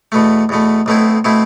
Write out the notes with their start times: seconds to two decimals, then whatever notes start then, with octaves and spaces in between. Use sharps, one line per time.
0.12 E2 B2 A3
0.49 E2 B2 A3
0.86 B1 B2 A3 C4 E4
1.24 B2 A3 C4 E4